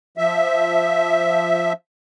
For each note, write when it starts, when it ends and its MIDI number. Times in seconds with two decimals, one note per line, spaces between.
0.17 1.73 53
0.17 1.73 76